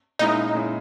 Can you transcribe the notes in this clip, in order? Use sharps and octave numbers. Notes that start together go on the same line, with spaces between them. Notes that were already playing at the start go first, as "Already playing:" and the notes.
A#2 G#3 C#4 D#4 E4
A#2 G#3 C#4 E4